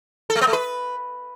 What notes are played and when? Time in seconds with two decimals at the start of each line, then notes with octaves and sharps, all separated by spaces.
0.30 A4
0.36 A3
0.41 B3
0.47 A3
0.53 B4